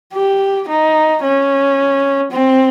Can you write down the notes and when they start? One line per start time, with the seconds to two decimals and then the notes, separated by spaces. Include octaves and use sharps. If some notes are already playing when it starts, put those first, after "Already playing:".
0.14 G4
0.68 D#4
1.23 C#4
2.31 C4